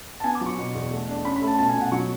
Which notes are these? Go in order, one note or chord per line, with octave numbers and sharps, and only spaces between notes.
A5
B3 G#5
D6
F#3
C#6
B2 C#6
E2
A3
D4
C#4 B5
B5
A3
A5
B2 A5
G#5
B2
F#5
F#3 C#6